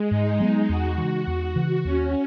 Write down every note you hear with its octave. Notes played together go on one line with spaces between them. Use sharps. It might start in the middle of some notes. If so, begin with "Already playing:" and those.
Already playing: G#3
G#2 D#4
F#3 B3
E2 F#4
C#3 E3
E2
C#3 E3
D#2 C#4